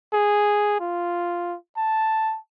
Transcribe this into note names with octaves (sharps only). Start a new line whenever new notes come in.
G#4
F4
A5